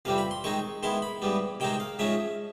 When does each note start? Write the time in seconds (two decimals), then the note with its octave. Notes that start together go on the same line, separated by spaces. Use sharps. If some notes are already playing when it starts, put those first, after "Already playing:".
0.05 F2 C3 E3 G3 C4 F5
0.18 B5
0.31 C6
0.44 D#3 G#3 C4 D#4 C#6
0.83 D#3 G#3 B3 E4 C6
1.02 B5
1.22 G#2 E3 G3 B3
1.60 C3 D#3 G#3 C4 D#4 G5
1.80 F5
1.99 G#2 F3 G#3 C#4 E5